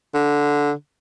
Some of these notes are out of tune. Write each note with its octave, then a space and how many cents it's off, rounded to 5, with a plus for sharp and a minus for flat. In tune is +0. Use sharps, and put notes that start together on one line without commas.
D3 -10